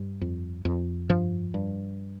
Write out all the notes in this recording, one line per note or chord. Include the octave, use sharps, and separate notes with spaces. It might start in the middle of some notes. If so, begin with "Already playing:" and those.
Already playing: G2
F2
F2
G2 F3
G2